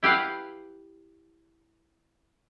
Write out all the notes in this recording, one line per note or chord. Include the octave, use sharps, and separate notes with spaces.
E4 G4 B4 F5 F#5